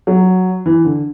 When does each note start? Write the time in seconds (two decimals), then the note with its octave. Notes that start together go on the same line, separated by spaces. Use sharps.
0.07 F#3
0.66 E3
0.85 D3